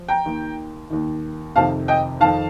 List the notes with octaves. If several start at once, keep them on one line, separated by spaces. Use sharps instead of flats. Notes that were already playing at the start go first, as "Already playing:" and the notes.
Already playing: F3
G5 A#5
D#2 D#3
D#2 D#3
F2 C3 D#3 F5 A5
D#5 G5
F2 D#3 F5 A5